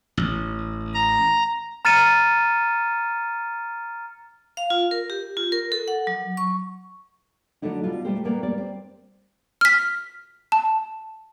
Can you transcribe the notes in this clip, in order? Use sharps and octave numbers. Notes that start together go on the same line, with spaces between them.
A1
A#5
A#5 F6 A6 C#7 D#7 E7
F5
F4
A#4
G4
F4
A#4
A4
F#5
F#3
C#6
D3 F#3 A3 D#4 E4
B2 G3 F4
G3 A3 A#3 G4 C5
A#2 G3 A#3 B3
G3 A#3 D5
C4
F6 B6
A5